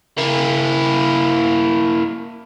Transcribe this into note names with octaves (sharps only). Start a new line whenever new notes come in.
A#3 E4